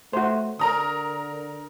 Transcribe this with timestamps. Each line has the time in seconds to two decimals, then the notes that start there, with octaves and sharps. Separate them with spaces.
0.13 A3 F#4 C5
0.59 D3 A#4 A#5 D#6